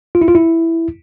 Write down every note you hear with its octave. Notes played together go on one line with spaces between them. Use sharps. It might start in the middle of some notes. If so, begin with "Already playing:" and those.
F4
E4
F4
E4